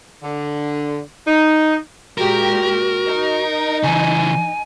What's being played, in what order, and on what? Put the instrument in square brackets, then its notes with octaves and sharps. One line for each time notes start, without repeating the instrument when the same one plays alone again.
[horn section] D3
D#4
[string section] A#2 G#3 G4 [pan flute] F#4 [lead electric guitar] A#4
[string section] D#4
[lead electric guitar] C#3 E3 [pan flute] G#5